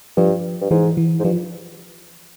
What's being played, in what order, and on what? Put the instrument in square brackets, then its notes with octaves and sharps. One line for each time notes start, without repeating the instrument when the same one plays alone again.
[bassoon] G2 [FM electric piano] F3
[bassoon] G2
[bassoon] G#2 [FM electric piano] E3
[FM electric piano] E3
[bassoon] G#2
[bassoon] G2 [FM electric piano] F3